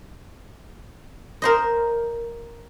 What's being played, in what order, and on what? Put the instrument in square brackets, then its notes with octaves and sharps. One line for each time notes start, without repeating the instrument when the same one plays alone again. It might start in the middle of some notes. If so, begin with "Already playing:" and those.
[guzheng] A#4 C5 D#5